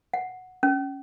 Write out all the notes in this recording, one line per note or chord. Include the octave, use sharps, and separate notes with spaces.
F#5
C#4